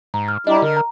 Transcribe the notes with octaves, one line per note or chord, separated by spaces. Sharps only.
G#2 A#5
F6
G3 D4 E4 G4 D#5 A#5
D3 A#4
A#5